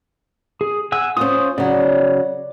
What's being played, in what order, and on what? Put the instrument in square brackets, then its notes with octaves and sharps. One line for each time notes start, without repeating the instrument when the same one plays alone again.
[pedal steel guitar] G#4
F#5 G#5 E6
[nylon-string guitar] C#4 F4 [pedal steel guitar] C5 D#6
[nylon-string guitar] C#3 F#3 [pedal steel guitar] D5